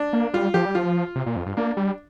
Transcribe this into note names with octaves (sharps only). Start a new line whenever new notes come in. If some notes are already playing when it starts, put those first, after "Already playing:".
Already playing: D4
A#3
G3 F4
F3 G4
G3
F3 F4
C3
A#2
F2
G2
A#3 D4
G3